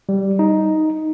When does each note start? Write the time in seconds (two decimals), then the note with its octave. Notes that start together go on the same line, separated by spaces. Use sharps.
0.09 G3
0.39 D#4